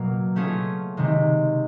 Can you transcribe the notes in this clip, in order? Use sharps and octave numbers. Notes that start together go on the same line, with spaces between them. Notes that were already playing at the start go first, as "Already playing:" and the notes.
Already playing: B2 F#3 A#3
A3 C#4 F4 G#4
C3 D#3 G#3